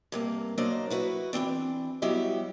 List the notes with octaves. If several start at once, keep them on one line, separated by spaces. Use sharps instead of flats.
G2 C3 A#3
F#3 A#3 D4 C5 D#5
E4 F#4 B4
E3 A#3 C4 D4
F#3 G3 B3 E4 G4 D#5